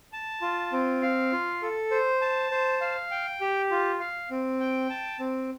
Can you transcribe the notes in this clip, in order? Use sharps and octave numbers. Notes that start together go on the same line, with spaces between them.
A5
F4
C4
F5
F4
A4
C5
A5
C5
F5
G5
G4
F4
F5
C4
G5
A5
C4